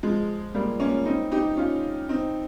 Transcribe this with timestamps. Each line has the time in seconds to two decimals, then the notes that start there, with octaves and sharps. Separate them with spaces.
0.03 F3 G#3
0.55 G3 A#3
0.80 A#3 C#4
1.05 C4 D#4
1.31 D#4 G4
1.57 C#4 F4
2.09 C4 D#4